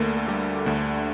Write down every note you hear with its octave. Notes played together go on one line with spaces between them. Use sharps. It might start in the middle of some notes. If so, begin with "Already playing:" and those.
Already playing: D2 D3 A3 A#3 A#4
A4
G3 G4
D2 D3 A3